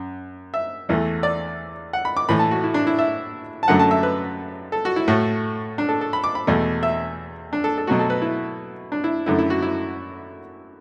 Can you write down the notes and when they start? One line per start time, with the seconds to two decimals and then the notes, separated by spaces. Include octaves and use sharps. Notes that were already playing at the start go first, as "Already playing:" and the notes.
Already playing: F#2
0.54 E5
0.89 E2 E3 A3
1.23 D5
1.93 F#5
2.05 B5
2.17 D6
2.29 A2 E3 A3 B5
2.39 A5
2.51 F#4
2.64 E4
2.74 D4
2.87 E4
2.99 E5
3.63 A5
3.68 F#2 D3 F#3 A3 F#5
3.79 A5
3.91 E5
4.03 B4
4.72 A4
4.85 F#4
4.96 E4
5.08 A2 A3 F#4
5.78 D4
5.89 A4
6.01 A4
6.13 B5
6.24 D6
6.35 B5
6.47 E2 B2 A3
6.83 E5
7.53 D4
7.64 A4
7.78 A4
7.87 B2 F#3 A3 F#4
7.99 A4
8.10 B4
8.22 E4
8.92 D4
9.04 E4
9.26 F#2 D3 A3 E4
9.39 E4
9.50 F#4
9.62 E4